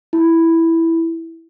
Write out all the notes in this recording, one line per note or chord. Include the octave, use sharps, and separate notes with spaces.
E4